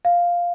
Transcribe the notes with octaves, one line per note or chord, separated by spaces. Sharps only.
F5